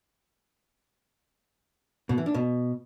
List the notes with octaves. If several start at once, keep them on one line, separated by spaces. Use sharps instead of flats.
B2
E3
D4
B2